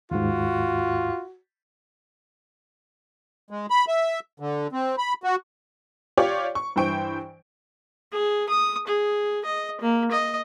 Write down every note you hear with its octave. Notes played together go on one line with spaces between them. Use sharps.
D#2 G#2 F4 F#4
G#3
B5
E5
D3
C4
B5
F#4
F4 G4 C#5 D5 D6
C#6
G2 E3 C5 G5 C#6 D7
G#4
D#6
G#4
D#5
A#3
D#5